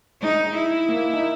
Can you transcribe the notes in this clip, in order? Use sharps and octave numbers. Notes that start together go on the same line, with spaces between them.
G#3 D#4
E4
A#3
D#4